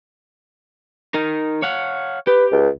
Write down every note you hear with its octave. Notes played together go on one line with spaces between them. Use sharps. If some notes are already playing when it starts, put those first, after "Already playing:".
D#4 A#4
C#5 F5 F#5
G4 B4
C#2